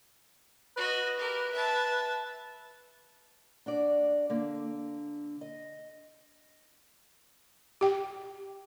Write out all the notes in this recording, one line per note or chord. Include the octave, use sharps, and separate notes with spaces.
F#4 B4 D#5
G4 A#4
E5 A5
D4 F#4 D5
D3 A#3
D#5
G4 G5